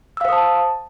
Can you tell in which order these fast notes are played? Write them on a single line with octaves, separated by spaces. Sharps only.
E6 F5 C5 D#6 A5